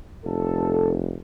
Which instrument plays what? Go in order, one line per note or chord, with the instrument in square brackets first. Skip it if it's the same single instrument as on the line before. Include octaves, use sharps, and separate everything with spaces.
[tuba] F1 [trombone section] A4